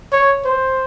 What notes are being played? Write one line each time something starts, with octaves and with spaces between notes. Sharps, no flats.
C#5
C5